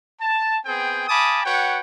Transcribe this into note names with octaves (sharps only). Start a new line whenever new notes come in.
A5
B3 C4 G#4 G5
F5 G#5 A5 B5 D6 D#6
F#4 B4 C#5 F#5 G5